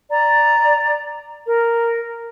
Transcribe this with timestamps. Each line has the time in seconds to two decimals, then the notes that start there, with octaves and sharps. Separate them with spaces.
0.10 D5 A#5
1.46 A#4